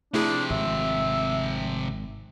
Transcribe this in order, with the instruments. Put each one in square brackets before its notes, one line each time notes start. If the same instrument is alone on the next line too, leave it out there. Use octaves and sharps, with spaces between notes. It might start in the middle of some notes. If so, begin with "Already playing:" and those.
[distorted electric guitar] C3 F3 [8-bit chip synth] A3 E4 G#4 [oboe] D4
[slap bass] G#1 [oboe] E5